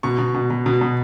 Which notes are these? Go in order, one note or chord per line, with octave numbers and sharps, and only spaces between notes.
B2 C#6
B2
B2
B2
B2
B2